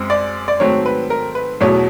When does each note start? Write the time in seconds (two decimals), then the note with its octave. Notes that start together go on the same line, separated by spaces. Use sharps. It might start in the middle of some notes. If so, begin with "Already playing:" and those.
Already playing: F#2 G#3 C4
0.10 D5
0.48 D5
0.60 G#2 D#3 F#3 A3 C4 C#5
0.86 B4
1.10 A#4
1.35 B4
1.61 E2 B2 F#3 A3 C#5